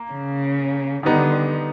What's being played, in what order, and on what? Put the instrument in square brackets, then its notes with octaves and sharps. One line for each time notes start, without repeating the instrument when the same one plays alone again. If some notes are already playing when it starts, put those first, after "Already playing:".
Already playing: [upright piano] A#3
[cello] C#3
[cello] D3 [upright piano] D#3 G3 B3 D#4